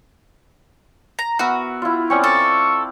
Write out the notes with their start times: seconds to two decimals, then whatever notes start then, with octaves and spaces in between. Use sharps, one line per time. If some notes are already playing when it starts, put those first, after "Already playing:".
1.19 A#5
1.39 B3 F#4 A#4 E5
1.82 E4 F4
2.10 C4 C#4 D5 C#6
2.24 A4 D5 C#6